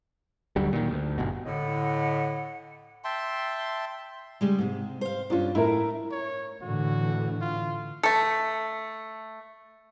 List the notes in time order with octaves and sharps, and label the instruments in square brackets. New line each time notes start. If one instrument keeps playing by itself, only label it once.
[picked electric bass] D2 D3 F#3 G3
A#2 D#3
D2
G1 B2
[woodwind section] A2 D3 E4 D#5 F#5
[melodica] E5 G5 A5 C6
[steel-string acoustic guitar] C#3 G3 G#3
G#2 C3
C5 F5
[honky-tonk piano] G2 F4 [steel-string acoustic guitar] C#4 D4
[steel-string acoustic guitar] A2 [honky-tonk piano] E4 A#4
[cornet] C#5
[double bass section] A2 D3 E3 [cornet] F#4
[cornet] F4
[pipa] A3 A4